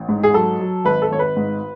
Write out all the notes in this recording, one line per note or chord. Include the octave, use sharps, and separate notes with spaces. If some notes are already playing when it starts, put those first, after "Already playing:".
Already playing: A1
G#2
G#4
F#3 A4
F#3
G#1 B4
A4
G#1 C#5
B4
G#2